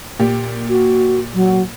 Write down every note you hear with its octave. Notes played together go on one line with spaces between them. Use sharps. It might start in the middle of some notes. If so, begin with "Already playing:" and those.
A#2 G4
F#4
F#3